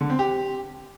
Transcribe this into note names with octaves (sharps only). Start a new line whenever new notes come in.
D3
C4
G4